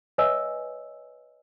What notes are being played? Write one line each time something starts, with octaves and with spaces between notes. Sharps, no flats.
B4 C#5 D#5 E5 G#5 E6